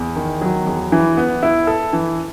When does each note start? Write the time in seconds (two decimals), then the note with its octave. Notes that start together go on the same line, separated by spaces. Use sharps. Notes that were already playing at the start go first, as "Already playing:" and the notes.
Already playing: E2
0.16 D#3
0.41 F#3
0.66 E2
0.92 E3
1.17 B3
1.43 E4
1.67 A4
1.93 E3